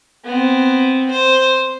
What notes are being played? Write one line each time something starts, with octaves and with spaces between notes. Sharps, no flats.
B3 C4
C5